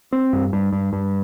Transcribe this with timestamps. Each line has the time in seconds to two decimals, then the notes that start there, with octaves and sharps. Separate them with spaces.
0.12 C4
0.33 G2
0.53 G2
0.73 G2
0.93 G2